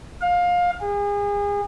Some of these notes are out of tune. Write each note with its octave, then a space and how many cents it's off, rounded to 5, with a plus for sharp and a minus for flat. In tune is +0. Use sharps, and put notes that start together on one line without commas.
F5 +20
G#4 -35